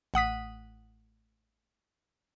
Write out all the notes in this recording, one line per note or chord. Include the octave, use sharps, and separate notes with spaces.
A1 F#5 D#6 B6